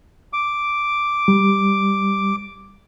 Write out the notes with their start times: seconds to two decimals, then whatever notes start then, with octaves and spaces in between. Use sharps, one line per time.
0.33 D6
1.28 G3